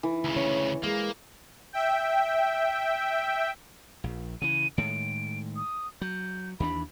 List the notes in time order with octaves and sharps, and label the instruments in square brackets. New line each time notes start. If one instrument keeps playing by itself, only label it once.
[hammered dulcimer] E3
[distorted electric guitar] D2 C#3
[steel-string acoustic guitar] C#4 C#5
[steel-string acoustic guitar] G#3 [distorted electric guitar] A#3
[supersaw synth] E5 G5
[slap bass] A#1
[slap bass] C#3 E3 [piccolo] D#7
[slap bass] A2 D#3 G#3 [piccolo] D7
[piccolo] D#6
[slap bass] F#3 [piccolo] G6
[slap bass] D#2 E3 D4 [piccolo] B5